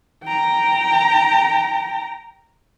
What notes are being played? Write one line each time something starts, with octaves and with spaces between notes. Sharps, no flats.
G5 A#5